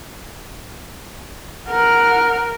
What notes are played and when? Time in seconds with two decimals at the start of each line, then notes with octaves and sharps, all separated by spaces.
1.68 A#4 F#5 F6